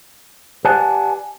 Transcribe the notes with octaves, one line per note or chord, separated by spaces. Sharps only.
G4 B4 D5 F#5 G#5 A5